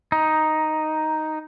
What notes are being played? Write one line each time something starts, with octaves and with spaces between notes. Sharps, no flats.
D#4